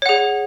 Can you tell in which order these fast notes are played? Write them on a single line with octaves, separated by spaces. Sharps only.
C#5 F#5 G#4